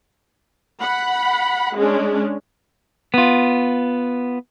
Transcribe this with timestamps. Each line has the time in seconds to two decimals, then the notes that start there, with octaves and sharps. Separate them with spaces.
0.81 F#5 B5
1.77 G#3 C#4 D4
3.14 B3 F4